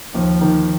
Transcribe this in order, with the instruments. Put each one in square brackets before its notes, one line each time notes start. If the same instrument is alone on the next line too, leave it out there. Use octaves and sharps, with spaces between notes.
[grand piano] D#2 [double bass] F3
[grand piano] D#3